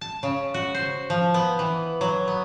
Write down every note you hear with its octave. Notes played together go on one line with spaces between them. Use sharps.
A5
C#3
F#4
C5
F3
B3
E3
F#3
B3